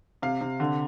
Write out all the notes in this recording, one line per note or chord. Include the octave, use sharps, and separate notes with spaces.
C3 F5
C3
D3